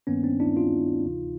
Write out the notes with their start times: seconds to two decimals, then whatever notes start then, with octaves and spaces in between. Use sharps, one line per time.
0.07 G2 D#3 G3 A#3 B3 C#4
0.23 C4 D4
0.40 D4 E4
0.56 D#4 F4
1.06 D2 C3 E3